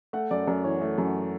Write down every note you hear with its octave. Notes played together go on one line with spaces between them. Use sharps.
A3 F#5
F#2 D5
F#2 D5
E3 C#5
A3
F#2